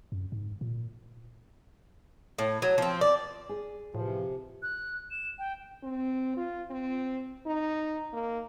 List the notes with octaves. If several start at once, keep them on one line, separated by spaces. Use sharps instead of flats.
F#2
G#2
A#2
A2
F#3
F3 C4
D5
G#4
F2 A2 C3 E3 F3
F#6
E7
G5
C4
F4
C4
D#4
A#3